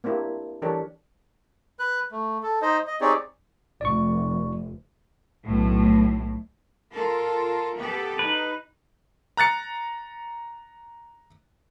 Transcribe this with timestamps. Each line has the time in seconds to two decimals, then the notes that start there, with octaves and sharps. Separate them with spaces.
0.04 A#3 C4 D4 E4 G4
0.62 E3 D4 G4 A4 A#4 C#5
1.79 B4 F#6
2.12 A3
2.43 A4
2.62 D#4 C5 D#5
2.87 D#5
3.01 C4 D#4 G4 G#4 C#5 D5
3.81 F1 D5 C#6
5.45 B1 A2
6.91 F4 A4 A#4
7.76 B3 G4 A4
8.19 D#4 B4
9.37 A#5 F#6 A6 C#7